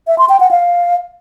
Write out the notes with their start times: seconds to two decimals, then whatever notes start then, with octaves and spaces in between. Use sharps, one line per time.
0.07 E5
0.18 C6
0.29 G5
0.40 F#5
0.51 F5